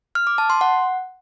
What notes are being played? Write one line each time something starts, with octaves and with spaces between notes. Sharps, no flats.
F6
D6
A5
C6
F#5